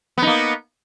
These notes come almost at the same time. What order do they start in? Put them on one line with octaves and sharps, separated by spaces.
B3 D#4 A#3